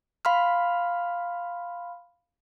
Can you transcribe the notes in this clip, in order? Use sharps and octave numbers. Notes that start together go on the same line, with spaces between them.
F5 B5 C6 F6